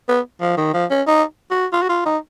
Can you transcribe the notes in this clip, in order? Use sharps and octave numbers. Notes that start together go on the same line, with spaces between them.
B3
F3
D#3
F3
C#4
D#4
F#4
F4
F#4
F4
D#4